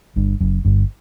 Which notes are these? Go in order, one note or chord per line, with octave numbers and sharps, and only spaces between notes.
G1 G2
F#1 F#2
G1 G2